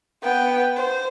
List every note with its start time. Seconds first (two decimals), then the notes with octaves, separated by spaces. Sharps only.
0.23 B3 G5
0.76 C5